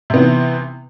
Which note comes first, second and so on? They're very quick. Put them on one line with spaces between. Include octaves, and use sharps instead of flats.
C3 B3 E3